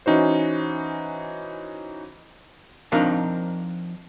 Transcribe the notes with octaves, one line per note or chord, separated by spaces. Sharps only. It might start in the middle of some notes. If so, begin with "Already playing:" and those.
E3 C#4 D#4 F#4 C5
F3 C4 D4 D#4 A#4 F5